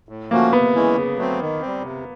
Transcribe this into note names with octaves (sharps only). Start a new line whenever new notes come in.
A2
F3 A3 A#3 C#4 F#4
C3 B3
E3 G#3 C#4 E4
C#3
F#3 A3 C4
D#3
G3 C4
C3